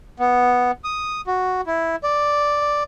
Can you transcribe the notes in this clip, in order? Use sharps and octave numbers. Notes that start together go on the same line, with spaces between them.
B3
D#6
F#4
E4
D5